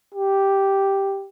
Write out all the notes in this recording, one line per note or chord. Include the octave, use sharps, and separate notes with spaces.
G4